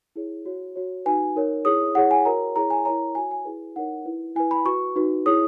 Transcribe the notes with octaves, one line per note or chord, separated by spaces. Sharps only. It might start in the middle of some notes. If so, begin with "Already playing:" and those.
E4 G#4 C#5
F#4 C#5
F#4 C#5
D#4 F#4 B4 G#5
D#4 A#4 C#5
E4 G#4 C#5 D#6
E4 G#4 C#5 F#5
G#5
F#4 A#4 C#5 A#5
E4 G#4 C#5 A#5
G#5
E4 A#4 C#5 A#5
F#4 C#5 G#5
G#5
E4 G#4 B4
D#4 A#4 C#5 F#5
E4 B4
E4 B4 G#5
B5
F#4 B4 C#6
D#4 F#4 B4
E4 G#4 C#5 D#6